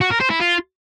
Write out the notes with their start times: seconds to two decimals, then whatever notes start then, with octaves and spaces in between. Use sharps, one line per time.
0.01 F#4
0.11 A#4
0.21 C5
0.30 E4
0.40 F4